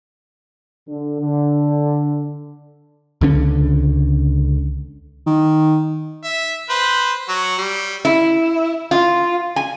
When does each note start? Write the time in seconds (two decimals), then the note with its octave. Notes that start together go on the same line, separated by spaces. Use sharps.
0.88 D3
1.21 D3
3.21 C#2 D3 C#4
5.27 D#3
6.24 E5
6.70 B4 C5
7.29 F#3 F#4
7.58 G3
8.05 E4
8.91 F4
9.56 G#5